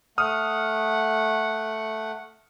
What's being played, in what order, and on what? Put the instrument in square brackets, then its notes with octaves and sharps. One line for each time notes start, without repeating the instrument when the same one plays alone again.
[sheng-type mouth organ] A3 F#5 [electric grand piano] D#6 F6